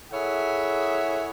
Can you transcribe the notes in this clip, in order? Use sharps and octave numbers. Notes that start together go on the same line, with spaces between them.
E4 G#4 A4 C#5 E5 F#5